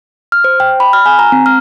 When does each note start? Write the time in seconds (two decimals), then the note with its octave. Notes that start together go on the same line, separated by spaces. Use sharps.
0.32 F6
0.44 C5
0.60 G5
0.80 B5
0.93 F6
1.06 G#5
1.19 A#5
1.32 C4
1.46 F6